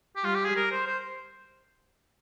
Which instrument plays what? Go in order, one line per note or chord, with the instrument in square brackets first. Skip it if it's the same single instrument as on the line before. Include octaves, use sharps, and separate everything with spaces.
[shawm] G4
[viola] G3 [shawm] F4
[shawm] G4
G#4
A#4
C5
C5